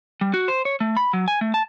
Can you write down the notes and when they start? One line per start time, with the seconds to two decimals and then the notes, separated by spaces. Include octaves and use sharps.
0.21 G3
0.34 F#4
0.48 C5
0.65 C#5
0.80 A3
0.97 B5
1.13 F#3
1.28 G#5
1.41 A3
1.54 A5